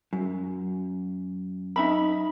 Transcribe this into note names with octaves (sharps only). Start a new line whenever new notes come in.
F#2
D#4 E5 B5